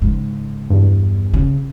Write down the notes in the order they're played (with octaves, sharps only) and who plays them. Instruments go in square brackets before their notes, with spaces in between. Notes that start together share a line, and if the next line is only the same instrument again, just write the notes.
[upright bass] G#2 C#3
[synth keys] E2 G2
[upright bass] C#3